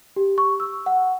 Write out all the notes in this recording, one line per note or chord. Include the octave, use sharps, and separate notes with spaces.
G4
C#6
E6
F#5